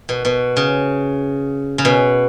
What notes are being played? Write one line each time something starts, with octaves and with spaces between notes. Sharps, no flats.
B2
B2
C#3
C#3
B2